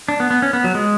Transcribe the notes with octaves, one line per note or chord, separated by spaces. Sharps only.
D4
B3
B3
C#4
B3
F#3
G#3